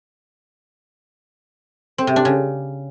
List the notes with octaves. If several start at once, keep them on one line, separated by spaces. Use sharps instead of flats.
C4
C3
D4
C#3